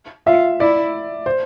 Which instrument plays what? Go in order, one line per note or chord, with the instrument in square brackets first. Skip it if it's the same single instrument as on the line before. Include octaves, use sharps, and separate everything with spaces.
[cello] F4 [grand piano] E5
[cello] E4 [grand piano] D5
[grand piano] C5